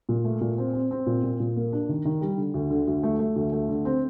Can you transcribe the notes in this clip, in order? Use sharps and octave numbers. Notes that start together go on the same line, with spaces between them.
A#2
A3
A#2
C4
C4
C4
A#2
A#2
A#2
A#3
D4
D#3
D#3
G3
D3
D2
D3
D2
A3
A3
D2
A3
D3
C4